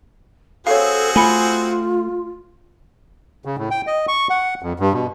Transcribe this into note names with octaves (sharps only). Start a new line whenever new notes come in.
C4 F#4 G#4 A4 C#5 F5
A3 F4 G#5 B5 C#7
C#3
A2
G5
D#5
C#6
F#5
F2
G2
B2